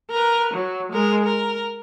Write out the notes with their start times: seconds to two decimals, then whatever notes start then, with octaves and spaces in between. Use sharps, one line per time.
0.11 A#4 B4
0.54 F#3
0.92 G#3 A#4
1.25 A#4